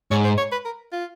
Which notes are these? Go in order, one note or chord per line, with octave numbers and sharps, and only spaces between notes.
G#2 C#5
C5
C#5
B4
A#4
F4